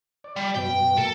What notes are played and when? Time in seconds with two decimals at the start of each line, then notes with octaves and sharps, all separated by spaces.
0.24 D5
0.36 G3
0.55 F#2 B2 G5
0.98 A3 A#3 A4